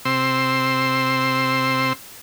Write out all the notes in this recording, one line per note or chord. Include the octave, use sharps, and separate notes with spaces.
C3 C4 C6 E6